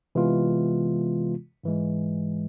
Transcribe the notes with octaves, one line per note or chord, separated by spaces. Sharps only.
C3 E3 G#3 B3 F4
G#2 E3 G#3